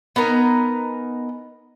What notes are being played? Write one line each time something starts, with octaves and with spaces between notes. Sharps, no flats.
B3 D#4 A#4 G#5